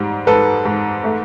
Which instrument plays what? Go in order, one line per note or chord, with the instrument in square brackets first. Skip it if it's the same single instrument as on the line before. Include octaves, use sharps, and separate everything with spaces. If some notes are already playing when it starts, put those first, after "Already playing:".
Already playing: [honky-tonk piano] G#2 G3
[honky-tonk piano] G#2 [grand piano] A4 B4
[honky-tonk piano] G#2
A3